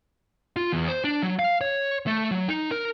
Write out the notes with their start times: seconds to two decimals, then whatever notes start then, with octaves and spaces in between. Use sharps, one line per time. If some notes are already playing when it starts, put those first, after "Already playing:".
0.56 F4
0.73 E2
0.88 C5
1.04 D4
1.23 F#3
1.39 F5
1.61 C#5
2.07 A3
2.31 F#3
2.48 D#4
2.71 A#4